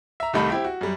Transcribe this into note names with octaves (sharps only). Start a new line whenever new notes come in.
E5 A#5
C2 D#3 G3 A3 D#4 B5
C4 E4 G4
F#4
F#2 G3